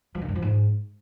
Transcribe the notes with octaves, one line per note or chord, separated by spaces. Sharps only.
F3
D#3
G2
F3
G#2